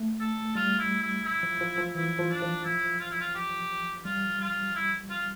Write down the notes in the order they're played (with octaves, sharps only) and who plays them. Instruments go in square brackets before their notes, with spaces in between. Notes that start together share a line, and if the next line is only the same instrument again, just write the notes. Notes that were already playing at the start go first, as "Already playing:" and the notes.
Already playing: [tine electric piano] A3
[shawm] A4
[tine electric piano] G3 [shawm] F4
[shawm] E4
E4
E4
[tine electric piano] F3
F3
F3
[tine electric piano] E3 [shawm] E4
[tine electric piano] F3
[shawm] D4
[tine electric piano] F3
[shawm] E4
F4
E4
F4
G4
[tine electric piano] G3 [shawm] F4
[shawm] F4
E4
F4